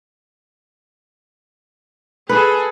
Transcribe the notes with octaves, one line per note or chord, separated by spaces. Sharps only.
G#4 A4 B4